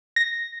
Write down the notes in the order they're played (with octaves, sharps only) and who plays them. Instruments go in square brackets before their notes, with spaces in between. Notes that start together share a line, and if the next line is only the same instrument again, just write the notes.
[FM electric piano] A#6